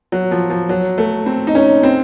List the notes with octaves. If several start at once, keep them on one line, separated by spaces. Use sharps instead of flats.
F#3
F3
F3
F#3
A3
C4
D#4
C#4
C4